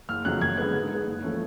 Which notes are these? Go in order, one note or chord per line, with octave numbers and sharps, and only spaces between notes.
F#1 F6
F2 C#3 F#3 F#6
F#2 G#6
D3 G#3 B3 F#6
G#2
G#3 B3
F#1
F3 A3 C#4